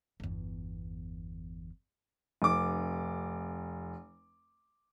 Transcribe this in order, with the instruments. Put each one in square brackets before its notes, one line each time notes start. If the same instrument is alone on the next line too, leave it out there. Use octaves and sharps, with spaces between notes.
[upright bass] G1 E2
[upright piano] F1 D6